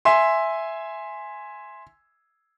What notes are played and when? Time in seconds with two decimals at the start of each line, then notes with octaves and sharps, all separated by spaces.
0.05 E5 G#5 C6